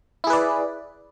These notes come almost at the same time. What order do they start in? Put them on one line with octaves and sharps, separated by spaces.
E4 G#4 B4 D5